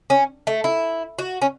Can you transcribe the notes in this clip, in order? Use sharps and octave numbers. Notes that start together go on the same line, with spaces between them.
C#4
A3
E4
F#4
C#4